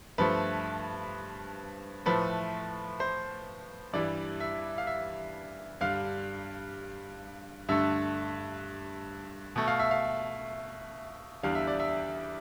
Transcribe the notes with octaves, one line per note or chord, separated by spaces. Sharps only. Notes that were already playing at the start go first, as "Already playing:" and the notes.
G2 F3 A3 B4
A2 F3 A3 B4
C5
G2 E3 G3 D5
E5
F5
E5
G2 D3 G3 F5
G2 D3 A3 E5
B2 A3
F5
E5
F5
E2 D3 G3 F5
E5
D5
E5